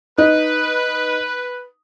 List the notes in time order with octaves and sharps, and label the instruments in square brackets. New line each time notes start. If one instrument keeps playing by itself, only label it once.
[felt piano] D#4 [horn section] B4